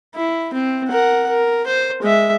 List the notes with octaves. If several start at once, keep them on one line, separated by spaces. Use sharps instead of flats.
E4
C4
A#4 F#5
A#4
C5
G#3 E5